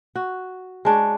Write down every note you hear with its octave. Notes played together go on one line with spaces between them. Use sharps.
F#4
G#3 D4 C#5